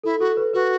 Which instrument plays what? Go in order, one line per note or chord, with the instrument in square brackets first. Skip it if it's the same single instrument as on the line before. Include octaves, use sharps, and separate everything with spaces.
[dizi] E4 [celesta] A4
[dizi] F#4 [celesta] A4
[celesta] B4
[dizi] F#4 [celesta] B4